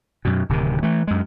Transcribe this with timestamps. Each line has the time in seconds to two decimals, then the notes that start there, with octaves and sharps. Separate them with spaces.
0.25 F#2 B2
0.49 D1 C3 D#3
0.83 E3 A3
1.07 F#2 G#3